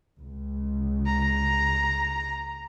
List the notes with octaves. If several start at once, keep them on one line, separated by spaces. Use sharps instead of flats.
C#2
A#5